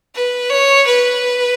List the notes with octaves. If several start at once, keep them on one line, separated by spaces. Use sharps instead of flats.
B4
C#5
B4